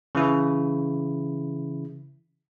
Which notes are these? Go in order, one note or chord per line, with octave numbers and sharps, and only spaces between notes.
C#3 E3 E4